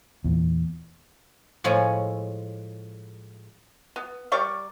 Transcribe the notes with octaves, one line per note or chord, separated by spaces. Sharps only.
E2 A#2
A2 F3 G#3 G#4 C#5 G#5
B3
G3 A#4 D5 C#6